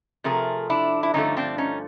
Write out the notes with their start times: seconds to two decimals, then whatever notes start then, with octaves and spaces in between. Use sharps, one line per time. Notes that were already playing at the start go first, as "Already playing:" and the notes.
0.24 C3 F3 A3 G#4 A#4
0.70 D4 E4
1.03 E4
1.14 G2 D3 F3 A3 C#4 D#4
1.37 C4 D4
1.58 C#4 D#4